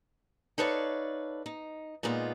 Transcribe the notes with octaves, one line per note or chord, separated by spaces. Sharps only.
D#4 A4 B4 C#5 D5 F5
D#4
A#2 G#3 B3 D#4 F4